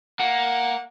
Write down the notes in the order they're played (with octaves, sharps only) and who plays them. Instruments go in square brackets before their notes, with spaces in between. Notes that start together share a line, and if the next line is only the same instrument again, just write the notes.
[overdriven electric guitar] A#3 [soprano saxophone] F#5